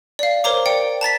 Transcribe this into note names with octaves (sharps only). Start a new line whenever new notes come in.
D5 F5
A#4 C5 C#5 A#5 D6
D5 G5 C#7
A5 A#5 A6 B6